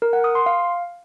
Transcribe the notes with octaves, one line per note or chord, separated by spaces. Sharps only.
A#4
F#5
D#6
C6
F5